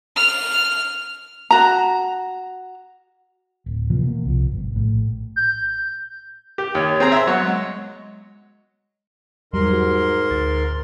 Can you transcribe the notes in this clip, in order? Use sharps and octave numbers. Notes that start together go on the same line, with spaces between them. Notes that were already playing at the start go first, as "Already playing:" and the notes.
F6
F#4 A#5
D1
C3 E3 F3 A#3
B2 A#3
C2 F3
G1
A#1 A2
G6
G4
D#2 C#5
C4 G#4 A#5
E5 C6
F#3 B3 C#5
G#3
E2 G#2 F#3 G3 A#4 C6
F#4
D2 A6